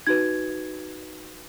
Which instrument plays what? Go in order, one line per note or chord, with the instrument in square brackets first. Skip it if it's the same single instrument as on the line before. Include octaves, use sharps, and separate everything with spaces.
[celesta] D#4 F#4 B4 G#6